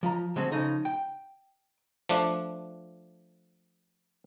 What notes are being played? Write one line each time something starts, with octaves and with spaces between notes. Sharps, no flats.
F3 A#5
D3 G#3 C4 F#4
C#3 F3 D#4 A4
G5
F3 A3 D4